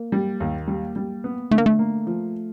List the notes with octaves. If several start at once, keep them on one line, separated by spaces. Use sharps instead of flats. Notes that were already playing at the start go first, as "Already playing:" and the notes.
Already playing: A#3
G3
D#2
G3
G3
B3
D3 A3
A#3
A3
A#3
F3